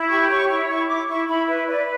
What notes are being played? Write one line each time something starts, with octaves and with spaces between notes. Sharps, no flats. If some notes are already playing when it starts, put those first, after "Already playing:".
Already playing: E4
G4 C#6
C#5 C#6
E4 C#6
E4 C#6
E4 D6
E4 C#6
E4 B5
B4 E5
B4 D5